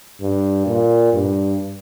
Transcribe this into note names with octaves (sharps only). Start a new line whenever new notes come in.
G2
A#2
G2